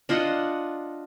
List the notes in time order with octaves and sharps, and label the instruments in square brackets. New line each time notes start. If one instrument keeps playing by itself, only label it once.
[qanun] D4 F4 D#5 F#5